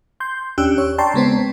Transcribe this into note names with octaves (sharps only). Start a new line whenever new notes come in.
C6 G6
D#2 C#4 D4 G4 E6 F#6
C#5
D5 G5 A5 A#5 C6 C#6
C#3 G#3 B3 C4